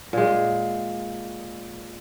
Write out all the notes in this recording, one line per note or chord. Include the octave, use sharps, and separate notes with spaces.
A#2 G#3